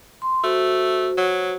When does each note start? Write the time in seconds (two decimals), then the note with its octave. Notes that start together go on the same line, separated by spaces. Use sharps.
0.22 C6
0.44 A3 F#4 C5
1.18 F#3